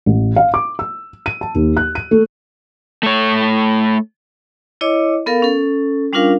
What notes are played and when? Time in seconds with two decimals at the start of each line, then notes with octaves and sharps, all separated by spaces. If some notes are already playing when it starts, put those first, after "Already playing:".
0.06 A1
0.36 F5
0.54 D6
0.79 E6
1.26 D#7
1.41 A5
1.55 D#2
1.77 F#6
1.95 D#7
2.11 A3
3.03 A3 C#5
4.81 E4 C#5 D#5 D6
5.26 B3 A4 A#4 F5
5.42 C#4 A4
6.13 G3 C#4 D4 F4 A#4 F5